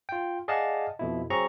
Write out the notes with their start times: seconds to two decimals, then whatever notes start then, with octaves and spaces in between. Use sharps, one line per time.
0.09 F4 G5
0.48 G#4 D5 D#5 F5 F#5 A5
0.99 F2 B2 E4
1.30 F#3 C4 G#4 A#5 C#6